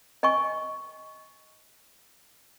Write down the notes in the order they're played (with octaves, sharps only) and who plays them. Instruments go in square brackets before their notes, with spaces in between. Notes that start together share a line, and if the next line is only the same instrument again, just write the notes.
[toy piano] D#5 G5 G#5 C#6